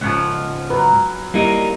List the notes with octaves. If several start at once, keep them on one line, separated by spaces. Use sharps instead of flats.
C#2 G#2 F3 C#4 F#5
F#3 B4
G3 A#3 D#4 E4